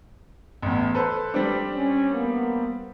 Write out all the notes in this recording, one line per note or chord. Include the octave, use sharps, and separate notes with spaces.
A1 E2
A4 B4 C5
G3 C4 D4
C#4
A#3 B3